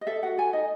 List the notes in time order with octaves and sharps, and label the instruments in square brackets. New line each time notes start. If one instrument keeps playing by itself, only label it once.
[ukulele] D#5
A4 E5
F#4 F#5
A4 G#5
D#4 D#5